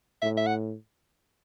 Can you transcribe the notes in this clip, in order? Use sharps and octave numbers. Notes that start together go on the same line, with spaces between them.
A2 E5
E5
F#5